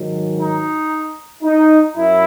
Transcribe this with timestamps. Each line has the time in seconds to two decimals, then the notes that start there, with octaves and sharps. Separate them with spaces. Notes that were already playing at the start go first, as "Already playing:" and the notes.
Already playing: G#2 D#3 F#3
0.38 D#4
1.43 D#4
1.96 F#2 E4